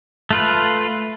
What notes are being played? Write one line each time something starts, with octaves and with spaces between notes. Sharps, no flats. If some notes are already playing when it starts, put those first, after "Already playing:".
A3 F4 B4